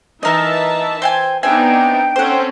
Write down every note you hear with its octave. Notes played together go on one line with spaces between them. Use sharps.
E3 D#4 A#4 D#5 E5 A5
C5 G5 G#5
B3 C4 D4 D#4 E5 G5 G#5
C4 C#4 A4 C5 F#5